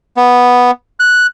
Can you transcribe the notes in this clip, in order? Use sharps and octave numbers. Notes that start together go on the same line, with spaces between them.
B3
F#6